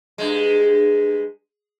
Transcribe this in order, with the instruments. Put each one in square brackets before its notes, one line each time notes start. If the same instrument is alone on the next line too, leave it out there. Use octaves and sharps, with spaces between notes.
[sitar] G2 G#3